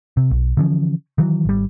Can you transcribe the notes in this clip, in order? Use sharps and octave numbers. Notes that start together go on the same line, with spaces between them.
C3
B1
D3 E3 F3 C#4
D#3 E3 F#3
G#1 G3